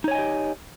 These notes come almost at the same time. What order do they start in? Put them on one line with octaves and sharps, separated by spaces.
D#4 C#5 G#5 D#5 G4